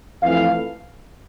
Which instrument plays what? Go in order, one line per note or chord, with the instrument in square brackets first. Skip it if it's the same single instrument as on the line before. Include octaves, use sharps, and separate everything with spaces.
[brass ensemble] F2 E3 A3 E4 F5